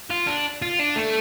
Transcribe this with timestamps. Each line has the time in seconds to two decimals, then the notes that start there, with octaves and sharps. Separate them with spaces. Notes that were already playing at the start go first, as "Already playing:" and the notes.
0.11 F4
0.27 D4
0.62 F4
0.79 D4
0.96 A3